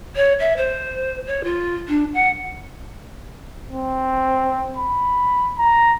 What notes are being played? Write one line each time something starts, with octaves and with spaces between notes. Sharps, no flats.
C#5
E5
C5
C#5
F4
D4
F#5
C4
B5
A#5